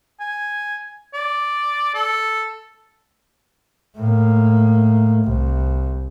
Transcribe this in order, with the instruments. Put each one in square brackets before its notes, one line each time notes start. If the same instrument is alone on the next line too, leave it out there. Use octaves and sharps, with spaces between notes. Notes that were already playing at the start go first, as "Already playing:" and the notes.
[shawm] G#5
D5
A4
[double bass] A2 A#3
C2